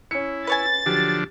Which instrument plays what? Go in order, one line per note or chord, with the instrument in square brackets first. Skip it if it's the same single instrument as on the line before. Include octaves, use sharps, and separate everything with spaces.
[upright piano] C#4 C#7 [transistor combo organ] E4
[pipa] B4 C#5 G#5 [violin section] A6
[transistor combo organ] D3 F3 D4 [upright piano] F#3 G4